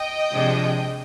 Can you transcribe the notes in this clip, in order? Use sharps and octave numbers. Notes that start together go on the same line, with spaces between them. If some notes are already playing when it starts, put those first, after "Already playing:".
Already playing: D#5 G5
C3 F3 G#3 D4